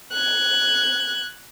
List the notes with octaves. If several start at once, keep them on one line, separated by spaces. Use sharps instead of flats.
F#6 G#6